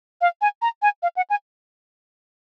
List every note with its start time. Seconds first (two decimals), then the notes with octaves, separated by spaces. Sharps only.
0.21 F5
0.41 G#5
0.62 A#5
0.82 G#5
1.03 F5
1.16 F#5
1.30 G#5